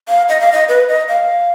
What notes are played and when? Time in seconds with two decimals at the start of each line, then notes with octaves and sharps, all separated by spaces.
0.08 F5
0.29 D#5
0.40 F5
0.52 D#5
0.69 B4
0.89 D#5
1.09 F5